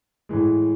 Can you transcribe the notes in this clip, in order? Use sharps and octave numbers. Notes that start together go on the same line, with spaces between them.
A2 E3 G#3